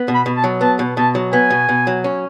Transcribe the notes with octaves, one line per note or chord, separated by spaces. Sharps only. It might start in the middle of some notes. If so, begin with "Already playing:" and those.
Already playing: B3
B2
B5
B2
A5
F#3
B3 A5
B2
B2 A5
F#3
B3 G#5
B2
B2
F#3
C#4